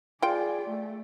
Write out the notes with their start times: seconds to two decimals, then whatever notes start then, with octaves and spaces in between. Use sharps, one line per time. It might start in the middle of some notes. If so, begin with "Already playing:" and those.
0.22 F4 G#4 D5 G5
0.69 A3